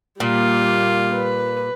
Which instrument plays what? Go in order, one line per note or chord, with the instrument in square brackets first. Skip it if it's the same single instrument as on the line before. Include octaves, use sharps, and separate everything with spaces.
[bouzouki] A#2 [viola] G3 A#3 [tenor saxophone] F4
[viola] B4